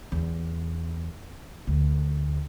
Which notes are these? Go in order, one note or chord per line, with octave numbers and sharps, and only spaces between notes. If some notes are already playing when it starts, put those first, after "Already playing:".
E2
D2